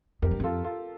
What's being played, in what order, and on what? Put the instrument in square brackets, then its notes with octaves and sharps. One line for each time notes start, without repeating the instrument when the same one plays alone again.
[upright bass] F2 [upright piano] G4 A#4
[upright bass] G2
[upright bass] F2 [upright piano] F4 A4
[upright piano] F4 A4